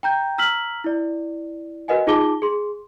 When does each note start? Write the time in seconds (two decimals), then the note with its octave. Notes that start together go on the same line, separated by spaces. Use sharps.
0.03 G5 A#5 G6
0.38 A#5 E6 F6 B6 F#7
0.84 E4 D5
1.88 F#4 A#4 B4 D#5 F#5 G#5
2.07 D#4 F4 G#4 A5 D6 G7
2.42 G#4 C6